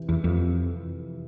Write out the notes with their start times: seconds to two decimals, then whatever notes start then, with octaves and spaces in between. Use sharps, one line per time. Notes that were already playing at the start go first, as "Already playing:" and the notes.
Already playing: C3 E3
0.09 E2
0.24 F2